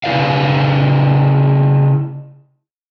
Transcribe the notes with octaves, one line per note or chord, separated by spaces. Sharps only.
C#3 E4 B4 D5 F5